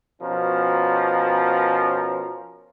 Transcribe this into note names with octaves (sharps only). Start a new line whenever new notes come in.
B2 F3 C#4 A#4